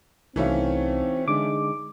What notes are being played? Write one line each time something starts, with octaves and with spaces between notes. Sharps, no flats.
C2 E3 A3 C4 C#4 D#4 F#4 F5
D3 G#3 D4 D#4 D6